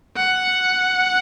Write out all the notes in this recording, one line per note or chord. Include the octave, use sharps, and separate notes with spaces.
F#5